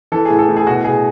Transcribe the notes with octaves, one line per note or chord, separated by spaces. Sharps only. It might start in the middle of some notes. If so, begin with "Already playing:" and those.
E3 A4
A2 G#4
A4
A2
G#4
B2 F#4
B2 G#4